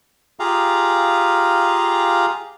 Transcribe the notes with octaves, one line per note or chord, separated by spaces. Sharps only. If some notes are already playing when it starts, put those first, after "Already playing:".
F4 G4 G#4 F5 A#5